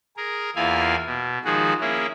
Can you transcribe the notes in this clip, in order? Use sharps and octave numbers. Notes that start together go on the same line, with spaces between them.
G#4 A#4
E2 A#3 E4 F4 F5 G#5
B2
D#3 F3 G#3 F#4 G#4
A#3 C#4 E4 G#4